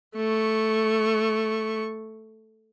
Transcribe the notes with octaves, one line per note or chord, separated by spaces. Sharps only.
A3 C#6